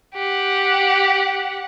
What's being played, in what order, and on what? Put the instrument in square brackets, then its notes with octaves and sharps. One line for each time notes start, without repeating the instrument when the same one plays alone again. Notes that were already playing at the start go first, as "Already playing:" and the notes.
[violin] G4 F#5